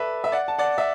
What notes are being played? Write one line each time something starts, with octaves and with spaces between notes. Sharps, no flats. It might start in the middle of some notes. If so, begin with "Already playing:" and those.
Already playing: A4 B4 D5 E5
E5
D5 F#5
A5
D5 F#5
E5